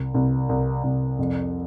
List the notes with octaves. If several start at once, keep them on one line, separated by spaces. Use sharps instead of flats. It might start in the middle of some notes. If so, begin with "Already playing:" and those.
Already playing: C2
C2
C2
C2
F2